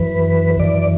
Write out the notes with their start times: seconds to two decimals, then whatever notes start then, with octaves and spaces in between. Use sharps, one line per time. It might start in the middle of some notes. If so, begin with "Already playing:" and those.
Already playing: F#2 E3 B4
0.59 F#2 E3 D5